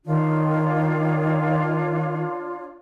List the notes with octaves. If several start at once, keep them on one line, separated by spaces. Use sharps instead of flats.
D#3 D4 F4 C#5